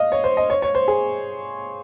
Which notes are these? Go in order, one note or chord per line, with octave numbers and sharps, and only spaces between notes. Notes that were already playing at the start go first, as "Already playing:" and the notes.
Already playing: D#5 F5
C#5
C5
D#5
C#5
C#5
C5
G#4